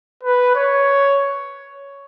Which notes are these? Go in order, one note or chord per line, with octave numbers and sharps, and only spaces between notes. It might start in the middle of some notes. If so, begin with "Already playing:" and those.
B4
C#5